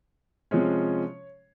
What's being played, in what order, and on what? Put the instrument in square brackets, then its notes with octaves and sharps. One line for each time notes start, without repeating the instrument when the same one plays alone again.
[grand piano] C3 F3 G#3 C#4 C#5